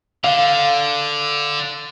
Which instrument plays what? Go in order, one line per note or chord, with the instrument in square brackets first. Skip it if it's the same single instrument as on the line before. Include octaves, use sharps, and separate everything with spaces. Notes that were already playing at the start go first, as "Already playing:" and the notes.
[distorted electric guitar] D3 [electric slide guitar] F5